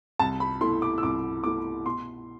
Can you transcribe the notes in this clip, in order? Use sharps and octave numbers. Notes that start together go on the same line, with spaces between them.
C2 A5
B5
B2 A3 E4 C6
D6
E6
C2 D6
B2 A3 E4 D6
B2 C6